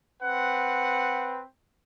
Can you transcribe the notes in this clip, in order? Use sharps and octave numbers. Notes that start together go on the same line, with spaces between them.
C4 B4 F#5